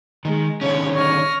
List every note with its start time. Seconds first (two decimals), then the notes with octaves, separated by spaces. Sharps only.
0.25 D#3 G#3
0.61 D3 D#3 C#4 C#5
0.94 C#5 D#5 F6